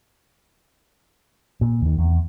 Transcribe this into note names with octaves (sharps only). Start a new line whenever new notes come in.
A#2
D#2 D#3
E2